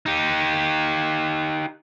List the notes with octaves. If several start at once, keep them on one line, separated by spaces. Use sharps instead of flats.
D#4 G4